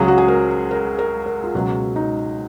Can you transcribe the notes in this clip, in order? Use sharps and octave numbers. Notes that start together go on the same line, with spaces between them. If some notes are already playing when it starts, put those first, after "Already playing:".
Already playing: C#2 C#3 F#3 G#4
F#4
G#4
A#4
A#4
A#4
A#4
F4
C#2 B2 F#3 F#4
D#4